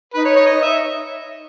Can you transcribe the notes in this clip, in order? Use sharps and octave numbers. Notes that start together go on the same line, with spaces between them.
D#4 B4
C#5
C#5
D#5
E5